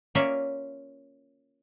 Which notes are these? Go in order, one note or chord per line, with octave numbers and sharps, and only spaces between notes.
A#3 C#4 F4 D5 E5